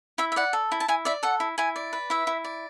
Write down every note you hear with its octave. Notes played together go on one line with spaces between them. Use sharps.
E4 E5
E5
D5 F#5
A4
E4
A5
E4 G#5
D5 E5
A4 F#5
E4
E4 G#5
D5
B4
E4 E5
E4
D5